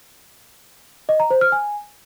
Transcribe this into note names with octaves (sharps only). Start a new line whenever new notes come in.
D#5
A#5
C5
F6
G#5